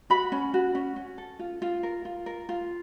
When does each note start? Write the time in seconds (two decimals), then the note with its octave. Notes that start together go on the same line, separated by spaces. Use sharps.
0.10 F#4 B5
0.32 C#4
0.54 F#4
0.75 C#4
0.96 C#4
1.18 A4
1.39 F4
1.62 F4
1.83 A#4
2.05 F4
2.26 A#4
2.49 F4